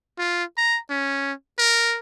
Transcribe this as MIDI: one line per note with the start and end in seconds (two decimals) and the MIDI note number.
0.18 0.44 65
0.57 0.78 82
0.90 1.32 61
1.58 1.99 70